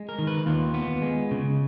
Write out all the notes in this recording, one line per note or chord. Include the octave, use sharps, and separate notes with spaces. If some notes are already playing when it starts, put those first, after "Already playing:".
Already playing: G#3
A#4
D#3
B4
D#2 F4
B3
G#3
C#3